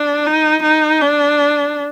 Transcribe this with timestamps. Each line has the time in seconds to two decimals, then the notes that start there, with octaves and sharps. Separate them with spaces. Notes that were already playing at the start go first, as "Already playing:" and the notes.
Already playing: D4
0.26 D#4
0.63 D#4
1.01 D4